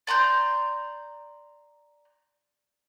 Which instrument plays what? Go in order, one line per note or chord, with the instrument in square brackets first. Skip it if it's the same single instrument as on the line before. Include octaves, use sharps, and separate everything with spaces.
[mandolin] D5 A#5 C6 G6